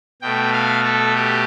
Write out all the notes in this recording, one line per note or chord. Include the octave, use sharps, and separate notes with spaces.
B2 A3 G5
F5
A4
G4